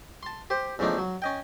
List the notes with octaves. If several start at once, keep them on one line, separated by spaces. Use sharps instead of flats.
A5 C6
G4 C5
E2 C#3 F3 A3 D4 D#4
F#3
C#4 D#5 G5